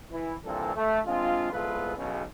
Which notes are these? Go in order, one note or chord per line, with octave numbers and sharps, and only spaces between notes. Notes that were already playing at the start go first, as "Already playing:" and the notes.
E3 E4
G2 A#2 E3 C4 A4
A3
G#3 C4 D4 F4
C2 G#3 B3 F4 A4 B4
B1 C#3